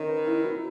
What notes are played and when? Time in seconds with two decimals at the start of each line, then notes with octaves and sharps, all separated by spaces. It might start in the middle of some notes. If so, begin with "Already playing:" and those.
Already playing: D#3 C#4
0.09 B4
0.27 E4
0.44 F#3